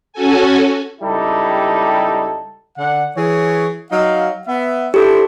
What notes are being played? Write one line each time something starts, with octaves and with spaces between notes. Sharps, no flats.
C#4 F#4 A4 G#5
C#2 G3 D#4 E4 G4 A4
D3 F#5
E3 G#4 C#5
F#3 D#4 F5
B3 E5
D4 E4 G4 A4 C5